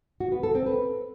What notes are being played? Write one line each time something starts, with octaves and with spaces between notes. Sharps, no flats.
F#4
B3
A4
C4
B4